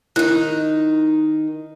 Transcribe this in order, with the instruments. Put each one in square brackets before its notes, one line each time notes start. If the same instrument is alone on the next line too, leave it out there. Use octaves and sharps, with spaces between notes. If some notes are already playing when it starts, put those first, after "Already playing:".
[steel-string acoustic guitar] D#3 D#4 [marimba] E4 F#6